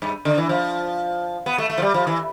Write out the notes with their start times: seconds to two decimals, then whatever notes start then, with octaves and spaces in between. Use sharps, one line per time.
0.02 G2
0.25 D3
0.38 E3
0.49 F3
1.46 B3
1.58 A3
1.70 A3
1.78 F3
1.82 G3
1.94 F3
2.07 E3